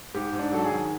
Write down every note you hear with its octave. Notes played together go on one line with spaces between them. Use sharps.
G#2 G4
G#2
D4
F#3 A4
G#4
D#3